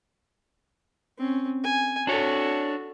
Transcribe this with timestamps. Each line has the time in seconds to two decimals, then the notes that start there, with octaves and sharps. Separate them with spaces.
1.18 C4 C#4
1.64 G#5
2.07 D4 F#4 A4 C#5 D5